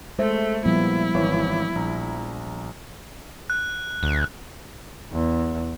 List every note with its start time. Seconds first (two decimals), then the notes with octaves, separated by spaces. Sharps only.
0.19 G#3 A3 C5 E5
0.65 A#2 F3 G3 B3 E4
1.14 G#1 E3 C#5
1.76 A#1 A#5
3.50 F#6
4.03 D2
5.12 E2